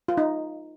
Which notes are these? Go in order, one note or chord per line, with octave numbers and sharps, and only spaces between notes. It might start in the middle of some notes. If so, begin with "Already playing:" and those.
F4
D#4